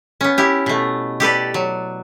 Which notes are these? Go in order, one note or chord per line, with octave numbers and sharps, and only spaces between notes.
B3 C#4
E4 G4
B2 A3
G4 A4 B4 D5
F#3